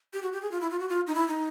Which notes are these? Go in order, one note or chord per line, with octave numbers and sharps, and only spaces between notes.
G4
F#4
G4
G#4
F4
E4
F4
F#4
F4
D#4
E4
D#4